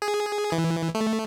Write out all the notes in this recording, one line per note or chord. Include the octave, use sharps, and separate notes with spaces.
G#4
E3
A3